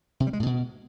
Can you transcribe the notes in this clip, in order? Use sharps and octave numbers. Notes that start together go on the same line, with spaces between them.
C3
G3
G#3
A2
B2